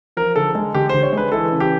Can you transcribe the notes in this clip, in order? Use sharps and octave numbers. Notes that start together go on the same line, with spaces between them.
F3 A#4
D3 A4
G#3
D3 G4
D3 C5
C#5
G#3 B4
E3 A4
C#3
G4